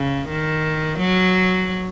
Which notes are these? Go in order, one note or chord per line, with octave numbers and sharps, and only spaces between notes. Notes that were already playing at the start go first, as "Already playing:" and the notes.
Already playing: C#3
D#3
F#3